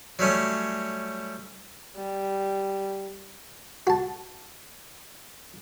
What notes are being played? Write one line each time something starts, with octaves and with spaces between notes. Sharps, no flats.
F#3 G3 A3 C#4
G3
F#4 A5